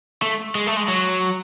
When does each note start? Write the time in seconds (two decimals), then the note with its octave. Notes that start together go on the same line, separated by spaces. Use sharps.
0.22 A3
0.55 G#3
0.67 A3
0.77 G#3
0.88 F#3